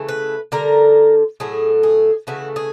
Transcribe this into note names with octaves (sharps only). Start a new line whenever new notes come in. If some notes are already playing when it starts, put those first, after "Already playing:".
Already playing: C#3 E3 A3
B4
D3 G3 A#4
A2 F#3 A3 G#4
G#4
C#3 E3 A3 F#4
G#4